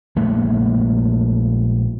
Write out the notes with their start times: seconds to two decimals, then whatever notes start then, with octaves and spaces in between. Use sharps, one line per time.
0.16 A#1 A#2 G#3 A3